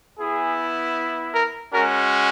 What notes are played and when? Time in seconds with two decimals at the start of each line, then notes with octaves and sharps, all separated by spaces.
0.19 B3 E4 G#4
1.35 A#4
1.74 G#3 C#4 F#4 A#4